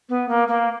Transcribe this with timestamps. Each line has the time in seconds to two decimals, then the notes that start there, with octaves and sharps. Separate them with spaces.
0.09 B3
0.29 A#3
0.48 A#3